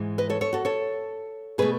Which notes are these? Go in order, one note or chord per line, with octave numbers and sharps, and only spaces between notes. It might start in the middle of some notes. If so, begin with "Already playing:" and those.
Already playing: G#2 E3 G#3
B4 D#5
A4 C#5
A4 C#5
F#4 A4
A4 C#5
B2 A3 G#4 B4